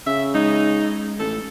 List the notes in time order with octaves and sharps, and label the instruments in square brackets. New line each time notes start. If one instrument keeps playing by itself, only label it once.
[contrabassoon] C#3 [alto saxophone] E5
[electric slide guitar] G#3 [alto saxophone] D#4
[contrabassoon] A1 [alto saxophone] A4